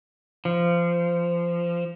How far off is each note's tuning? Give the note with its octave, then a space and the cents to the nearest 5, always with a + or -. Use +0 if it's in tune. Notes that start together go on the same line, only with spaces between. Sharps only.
F3 -20